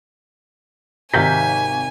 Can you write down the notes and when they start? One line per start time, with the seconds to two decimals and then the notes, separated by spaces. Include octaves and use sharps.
1.14 G#1 C3 D#3 F5 G#5 G6 B6